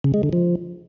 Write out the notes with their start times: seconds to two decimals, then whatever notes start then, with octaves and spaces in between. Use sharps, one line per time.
0.04 C#3
0.14 G#3
0.23 D3
0.33 F3